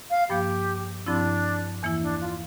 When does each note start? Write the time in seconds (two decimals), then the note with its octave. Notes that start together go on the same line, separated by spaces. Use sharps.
0.10 F5
0.29 G2 F3 A#3 G4
1.06 G2 F3 C4 D4 E4
1.83 E2 E3 A#3 E4
2.02 D4
2.21 F4